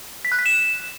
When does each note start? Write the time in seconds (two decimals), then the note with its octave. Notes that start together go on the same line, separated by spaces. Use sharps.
0.25 B6
0.32 F#6
0.39 B6
0.46 E7